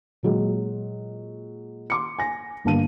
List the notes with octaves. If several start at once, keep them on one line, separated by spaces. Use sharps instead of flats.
A#2 F#3 G#3
C6 D6 C#7
G#5 A#6
G1 G2 A#3 A5 D#7